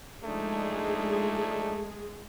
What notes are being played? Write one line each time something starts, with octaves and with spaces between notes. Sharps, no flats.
F3 G#3 A3 D4 D#4 G#4